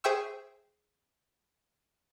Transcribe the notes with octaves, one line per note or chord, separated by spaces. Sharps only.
G#4 C5 E5 G5 C#6 E6